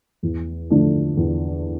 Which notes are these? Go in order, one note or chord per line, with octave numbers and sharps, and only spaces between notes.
E2
D3 F3 A3 D4
E2